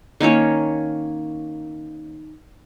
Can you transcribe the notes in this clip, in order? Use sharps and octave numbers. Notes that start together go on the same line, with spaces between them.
D#3 A#3 C#4 C#5